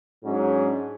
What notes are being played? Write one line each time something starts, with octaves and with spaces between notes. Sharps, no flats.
G#2 F#3 C#4 D4